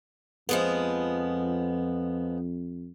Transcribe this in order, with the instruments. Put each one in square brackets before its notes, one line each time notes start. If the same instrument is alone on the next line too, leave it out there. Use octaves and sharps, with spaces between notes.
[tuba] F2 [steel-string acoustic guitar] F3 G#3 B3